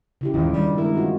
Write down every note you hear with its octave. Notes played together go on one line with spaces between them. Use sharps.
C#3 E4 G4
D#2 G#2 D#3 E3 F4
G2 D#3 G3
G#3 C4 E4 A#4
F4 F#4